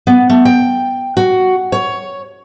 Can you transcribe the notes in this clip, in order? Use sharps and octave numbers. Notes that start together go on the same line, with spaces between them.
B3
A3
G5
F#4
C#5